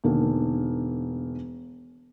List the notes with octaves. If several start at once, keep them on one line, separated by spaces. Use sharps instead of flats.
E1 D3 D#3 A#3